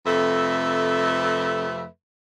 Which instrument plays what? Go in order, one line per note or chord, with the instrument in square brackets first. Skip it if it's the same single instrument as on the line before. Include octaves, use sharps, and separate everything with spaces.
[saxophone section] F2 C3 A3 A4 B4 E5